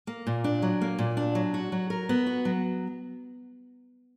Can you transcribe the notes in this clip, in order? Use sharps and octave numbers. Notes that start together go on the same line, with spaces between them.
A#3
A#2
D4
F#3
A#3
A#2
D4
F#3
F#4
F#3
A#4
B3
F#4
F#3